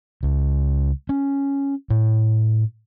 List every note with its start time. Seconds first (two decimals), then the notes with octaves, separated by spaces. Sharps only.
0.23 C#2
1.09 C#4
1.90 A2